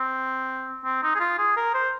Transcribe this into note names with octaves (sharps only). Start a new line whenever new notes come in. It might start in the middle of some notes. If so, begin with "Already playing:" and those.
Already playing: C4
C4
D#4
G#4
F4
G#4
A#4
C5